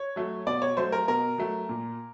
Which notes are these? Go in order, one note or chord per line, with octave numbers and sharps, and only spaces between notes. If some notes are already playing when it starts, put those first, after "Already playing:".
Already playing: C#5
F#3 A3
B2 D5
C#5
F#3 A3 C5
A#4
B2 A#4
F#3 A3
A#2